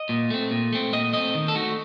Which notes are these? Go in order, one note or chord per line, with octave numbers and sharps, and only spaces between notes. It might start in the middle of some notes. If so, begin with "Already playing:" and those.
Already playing: D#5
A#2
A3 C4
A#2
A3 C4
A#2 D#5
A3 C4 D#5
D#3
A4
A3 D#4 F#4